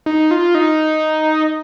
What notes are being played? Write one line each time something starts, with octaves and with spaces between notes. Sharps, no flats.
D#4
F4
D#4